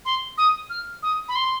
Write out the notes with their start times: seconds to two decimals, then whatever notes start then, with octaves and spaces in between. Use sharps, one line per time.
0.05 C6
0.38 D#6
0.70 F6
1.03 D#6
1.28 B5
1.35 C6